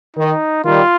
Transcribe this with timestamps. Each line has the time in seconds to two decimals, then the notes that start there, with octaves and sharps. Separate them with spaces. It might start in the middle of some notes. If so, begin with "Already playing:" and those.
0.17 D#3 D#4
0.65 D#3 G3 F4